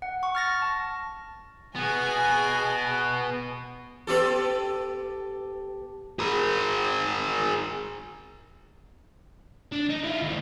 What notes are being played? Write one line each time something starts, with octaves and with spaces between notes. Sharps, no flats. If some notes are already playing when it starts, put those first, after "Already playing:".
F#5
C#6
F6 A6 A#6
A5
B2 B3 G#4 G#5
B3 G4 A4
G#4 A#4
D4
D#4
E4 F4
D2 D#3